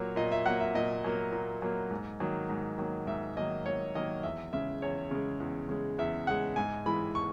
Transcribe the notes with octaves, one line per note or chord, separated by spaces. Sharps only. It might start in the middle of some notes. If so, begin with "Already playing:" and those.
Already playing: A#2 F#3 A#3 C#5
A#2 D#5
E5
F#3 A#3 F#5
E5
A#2 D#5
F#3 A#3
A#2
F#3 A#3
G#2
D#3 F#3 A#3
G#2
D#3 F#3 A#3
G#2 E5
D#3 F#3 A#3 D#5
G#2 C#5
D#3 F#3 A#3 D#5
E2 E5
C#3 G#3 E5
E2 C#5
C#3 G#3
E2
C#3 G#3
E2 E5
C#3 G#3 F#5
G#2 G#5
E3 G#3 B5
C#6